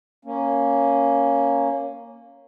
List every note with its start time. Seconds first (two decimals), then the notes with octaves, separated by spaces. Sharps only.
0.25 A#3 C#4